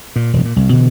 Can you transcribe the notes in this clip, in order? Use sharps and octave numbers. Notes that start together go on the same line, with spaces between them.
A#2
E1 F#2 B2
A#2
C2
B2 D3 E3